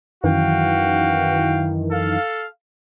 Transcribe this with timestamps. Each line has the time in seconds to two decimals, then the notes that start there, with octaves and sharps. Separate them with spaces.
0.24 F#2 D#3 E3 F#4 F5 G5
1.91 A4 F5